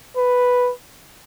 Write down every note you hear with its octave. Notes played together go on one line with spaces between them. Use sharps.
B4